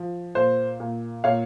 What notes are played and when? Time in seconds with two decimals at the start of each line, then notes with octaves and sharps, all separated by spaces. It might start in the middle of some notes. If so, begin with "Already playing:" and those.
Already playing: F3
0.35 A#2 C5
0.80 A#2
1.24 A#2 C#5 F5